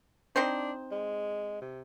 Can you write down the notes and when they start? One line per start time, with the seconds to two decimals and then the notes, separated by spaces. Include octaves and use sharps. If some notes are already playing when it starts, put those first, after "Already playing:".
0.36 C4 D4 D#4 C5
0.91 G#3
1.61 C3